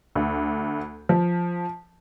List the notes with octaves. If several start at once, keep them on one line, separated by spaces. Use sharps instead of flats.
D2
F3